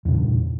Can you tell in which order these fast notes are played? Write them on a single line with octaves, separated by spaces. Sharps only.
E2 C#3 A#2 G2